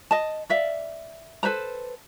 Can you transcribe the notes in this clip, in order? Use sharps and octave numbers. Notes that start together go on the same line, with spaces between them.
D#5 A5
D5 E5 F5
A4 B4 C5 A#5